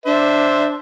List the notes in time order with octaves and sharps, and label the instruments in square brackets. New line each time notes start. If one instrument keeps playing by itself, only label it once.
[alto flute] D4 [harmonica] C5 E5